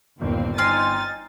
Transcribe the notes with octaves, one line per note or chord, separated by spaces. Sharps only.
G1 D#2 A#2 C4
C4 D#4 G4 G#5 C6 F6 A6